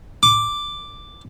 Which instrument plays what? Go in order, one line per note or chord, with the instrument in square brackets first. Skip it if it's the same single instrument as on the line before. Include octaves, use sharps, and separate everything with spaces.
[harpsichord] D6